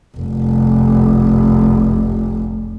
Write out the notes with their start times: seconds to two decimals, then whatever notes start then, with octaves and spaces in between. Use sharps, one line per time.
0.17 F1 C2